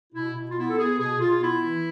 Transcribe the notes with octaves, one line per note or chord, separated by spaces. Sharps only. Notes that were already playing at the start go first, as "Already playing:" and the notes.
B2 E4
B2
F4
B3 E4
A4
B3 G#4
B2 G#4
B2 F4
B3 E4
E3